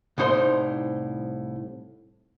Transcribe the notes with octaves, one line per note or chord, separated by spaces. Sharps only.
C2 A2 D#4 C5 C6